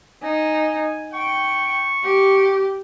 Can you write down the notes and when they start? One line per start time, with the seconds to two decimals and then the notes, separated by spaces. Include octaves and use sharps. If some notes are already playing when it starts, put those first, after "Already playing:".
0.22 D#4 G#5
1.13 G5 C#6
2.04 G4